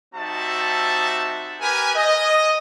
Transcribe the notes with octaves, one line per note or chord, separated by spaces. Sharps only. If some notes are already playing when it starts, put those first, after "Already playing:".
G3 C4 D#4 F#4 E5 A5
G4 A#4 B4 G#5
D#5